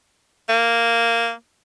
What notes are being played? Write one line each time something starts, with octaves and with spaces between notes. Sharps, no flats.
A#3